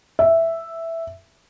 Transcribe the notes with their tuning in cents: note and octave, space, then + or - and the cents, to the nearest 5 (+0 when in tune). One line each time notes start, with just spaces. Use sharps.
E5 +0